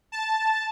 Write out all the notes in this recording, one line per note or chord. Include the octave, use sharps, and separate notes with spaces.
A5